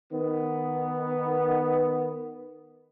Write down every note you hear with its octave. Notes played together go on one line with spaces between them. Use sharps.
D#3 B3